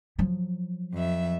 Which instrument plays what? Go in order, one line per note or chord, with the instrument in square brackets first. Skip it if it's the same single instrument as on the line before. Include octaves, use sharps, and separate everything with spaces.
[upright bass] F3 F#3
[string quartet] F2 E5